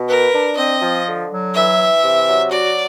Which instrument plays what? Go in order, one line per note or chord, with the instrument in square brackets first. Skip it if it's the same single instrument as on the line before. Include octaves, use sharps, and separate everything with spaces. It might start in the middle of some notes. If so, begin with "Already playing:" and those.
Already playing: [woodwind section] B2
[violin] A#4 [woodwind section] B4
[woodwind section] D4
[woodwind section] C4 [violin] D#5
[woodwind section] F3
D3
F#3
[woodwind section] E3 [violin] E5
[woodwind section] E3
C3
F#3
[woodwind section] F#4 [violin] D5